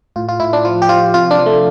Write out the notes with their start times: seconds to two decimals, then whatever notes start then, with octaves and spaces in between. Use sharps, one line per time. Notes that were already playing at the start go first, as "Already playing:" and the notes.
0.16 A2 F4
0.29 F4
0.40 A2 E4
0.53 D4
0.65 F3 F4
0.82 G4
0.89 F3 F4
1.14 C3 F4
1.31 D4
1.38 F3
1.46 A3